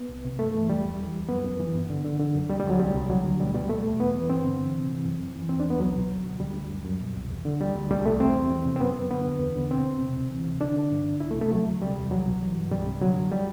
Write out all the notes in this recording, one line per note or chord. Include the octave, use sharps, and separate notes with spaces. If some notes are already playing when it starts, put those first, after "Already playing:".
Already playing: B3
C2
C3
G2 A3
E3
E2 G3
E2
E3
D2
F#2 B3
F#2
E3
G2
D3
D3
D3
F#2
D2 G3
G3
D2
F#3
C2 G3
C2
D2 F#3
D2
B2 G3
B2 G3
B2 A3
E2
E2 B3
E3
G2 C4
D3
E3
C3
E3
F#2
F#2
E3
E2 C4
D4
E2
B3
C2 F#3
B2
D2
D2
D2 G3
D2
F#2
F#2
B2
C2
E2
D3
D2 G3
D2
C2 G3
C2 A3
E2 C4
E2
E2
C3
C4
F#2 B3
F#2
D3 B3
D2
E2
D3
B2 C4
E2
C3
D2
E3
C3
D3 D4
D3
G2
D3
C2 E4
A3
C3
A3
D2 F#3
D2
C3 G3
E2
C2 F#3
B2
E3
G2
C2 G3
C3
D3 F#3
F#2
G3